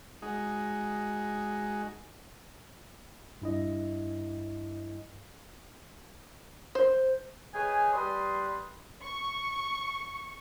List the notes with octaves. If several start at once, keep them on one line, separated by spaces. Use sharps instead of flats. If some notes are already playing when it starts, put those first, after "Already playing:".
G#3 D#4 F#4 G#4
G2 E4 D#5
C5
G#4 B4 C#5 D#5 G5 G#5
G3 B4 C6 D#6
C#6